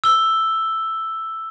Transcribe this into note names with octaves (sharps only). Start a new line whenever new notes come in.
E6 G7